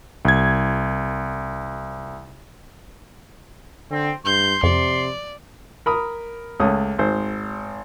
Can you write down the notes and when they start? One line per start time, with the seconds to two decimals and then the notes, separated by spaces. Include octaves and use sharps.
0.25 C2 G#6
3.91 D3 C4
4.25 G2 C6 G6
4.63 F2 C3 D5
5.86 A#4 B5 D#6
6.60 C#2 A3 C#4 D#6
6.98 G#1 C5